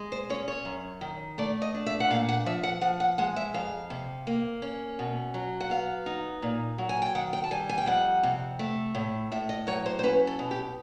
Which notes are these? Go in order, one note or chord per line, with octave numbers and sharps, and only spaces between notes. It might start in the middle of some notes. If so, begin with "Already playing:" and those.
Already playing: G#3
C5
C#4 C#5
C#5
F#2
D#3
A3 D5
D#5
D4
E5
F#5
A#2 F5
F#5
F3 E5
F#5
F3 F#5
F#5
G#3 F#5
E5
F2 F5
C3
A#3
C#4
B2
F#3
F#5
B3 F5
D#4
A#2
F#3
G#5
G5
D#3 F#5
G5
A5
G3 G#5
G#5
G5
F2 F#5
C3
A3
A2
A2 E5
D#5
F#3 C#5
C5
C5
C#4 B4
A4
B2
G4